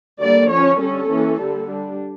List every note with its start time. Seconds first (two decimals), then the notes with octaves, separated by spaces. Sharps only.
0.21 D3 G3 A#3 D5
0.50 F3 C#4 C#5
0.80 D3 G3 C#4 A4
1.09 E3 A#3 C#4
1.38 D3 G3 A#3
1.69 G3 D4